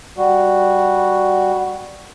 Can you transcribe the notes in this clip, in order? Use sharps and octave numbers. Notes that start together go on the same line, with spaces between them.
G3 F#4